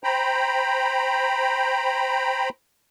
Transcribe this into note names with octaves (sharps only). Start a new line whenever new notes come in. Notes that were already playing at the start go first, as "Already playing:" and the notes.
C5 G5 A#5 B5